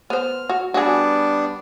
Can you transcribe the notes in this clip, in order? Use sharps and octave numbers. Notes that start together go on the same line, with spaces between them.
B3 C5 F6
F#4
G3 B3 D4 F#4 G#4